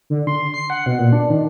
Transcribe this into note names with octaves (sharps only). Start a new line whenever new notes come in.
D3
C6
C7
F#5
B2
A#2
D4
D#3